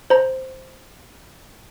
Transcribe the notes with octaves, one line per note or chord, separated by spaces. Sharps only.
C5 A#5